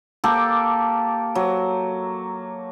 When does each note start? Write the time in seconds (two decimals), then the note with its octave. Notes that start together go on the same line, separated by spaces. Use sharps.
0.24 A#3 G4 A4
1.35 F#3